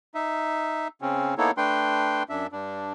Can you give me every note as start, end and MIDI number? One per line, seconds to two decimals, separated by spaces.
0.15 0.88 63
0.15 0.88 76
1.02 1.34 49
1.02 1.34 60
1.02 1.34 61
1.38 1.51 58
1.38 1.51 59
1.38 1.51 63
1.38 1.51 64
1.38 1.51 69
1.38 1.51 73
1.57 2.23 57
1.57 2.23 62
1.57 2.23 71
1.57 2.23 79
1.57 2.23 84
2.29 2.47 42
2.29 2.47 62
2.29 2.47 76
2.52 2.93 43
2.52 2.93 62